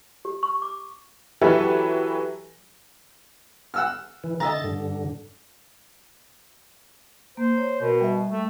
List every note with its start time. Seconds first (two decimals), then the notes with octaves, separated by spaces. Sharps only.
0.25 G4
0.43 C#6
0.62 D6
1.41 E3 F#3 G4 A4 B4 E5
3.74 F#5 E6 F6
4.24 E3
4.40 D3 D#5 E5 A#5 A6
4.64 G2 D3
7.37 A#3 C5
7.58 C#5
7.81 B2 A#4
8.01 G3 E5
8.31 A3